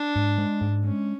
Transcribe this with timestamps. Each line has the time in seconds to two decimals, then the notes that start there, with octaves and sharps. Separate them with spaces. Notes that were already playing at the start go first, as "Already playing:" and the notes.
Already playing: D4
0.16 G#2
0.38 G#3
0.61 G#2
0.84 G#3 C#4